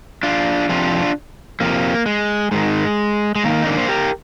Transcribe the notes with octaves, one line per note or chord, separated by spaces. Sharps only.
D4 F4
F2 C3 F3 D4 F4
F2 C3 F3 A#3
G#3
G#2 D#3 G#3
G#3
G#2 D#3 A#3
D#4
A#3 D4
C5
G4 A#4